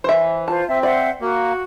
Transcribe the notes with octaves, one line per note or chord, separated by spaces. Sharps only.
E3 C5 E5
F4 C5 A5
C4 E5
C5 D5 E5 F#5
A#3 F#4